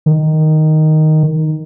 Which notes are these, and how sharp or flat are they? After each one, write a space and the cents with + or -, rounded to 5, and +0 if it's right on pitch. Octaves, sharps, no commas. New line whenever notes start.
D#3 +0